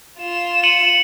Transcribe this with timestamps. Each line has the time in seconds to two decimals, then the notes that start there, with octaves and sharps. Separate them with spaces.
0.19 F4 E7
0.64 C#7 D#7 F#7